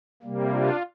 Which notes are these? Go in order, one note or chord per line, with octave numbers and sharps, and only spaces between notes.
C3 G3 A#3
D4 F4